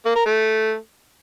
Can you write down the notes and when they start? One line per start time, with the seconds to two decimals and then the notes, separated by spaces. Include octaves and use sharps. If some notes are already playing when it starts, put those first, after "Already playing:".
0.06 A#3
0.16 A#4
0.26 A3